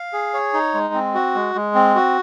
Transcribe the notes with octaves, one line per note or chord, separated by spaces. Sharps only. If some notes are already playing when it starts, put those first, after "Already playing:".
Already playing: F5
G#4
C#5
D#4
G#3
C4
F#4
G#3
G#3
C4
F#4